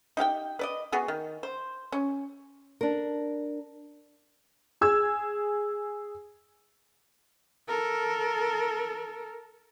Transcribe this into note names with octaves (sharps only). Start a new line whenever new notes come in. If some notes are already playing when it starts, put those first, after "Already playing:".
D#4 G4 F5 G5
B4 D5 D#5
B3 F#4 G#4
D#3
C5
C#4
D4 A#4
G#4 E6 G#6
A4 A#4